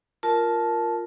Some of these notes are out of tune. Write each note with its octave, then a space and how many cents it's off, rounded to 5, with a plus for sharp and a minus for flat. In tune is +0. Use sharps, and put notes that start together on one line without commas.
F4 +0 A#4 +0 A5 -15